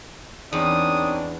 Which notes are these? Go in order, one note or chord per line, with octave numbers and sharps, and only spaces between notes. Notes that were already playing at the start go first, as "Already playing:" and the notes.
E2 C4 D4 D#4 C#5 D#6